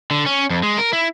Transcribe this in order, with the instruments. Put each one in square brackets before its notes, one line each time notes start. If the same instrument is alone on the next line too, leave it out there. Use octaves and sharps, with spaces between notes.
[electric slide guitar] D3
C#4
F2
G#3
A#4
E4